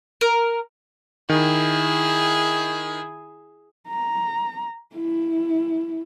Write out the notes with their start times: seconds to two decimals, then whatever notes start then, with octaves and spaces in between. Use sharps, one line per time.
0.21 A#4
1.29 D#3 E4 G#4
3.89 A#5
4.95 E4